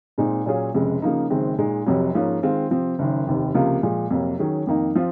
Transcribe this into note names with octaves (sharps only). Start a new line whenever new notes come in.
A#2 G#3 C4 D#4
A#2 F#3 C#4 F4 G#4
F1 F2 C#3 G#3
C#3 F3 A#3 D#4
F#1 F#2 D#3 G#3 C4
A#2 G#3 D#4
F1 F2 C3 F#3
G#2 F3 A#3 C#4
D#3 G#3 C4 F4
C3 F3 C4
F#1 F#2 D#3
F1 D#2 D#3
C#2 C3 F3 A#3 F4
A#2 F3 G#3
F2 C3 F#3 A#3
D#3 F#3 C#4 G#4
F2 D#3 A#3 D#4
F3 C4 F4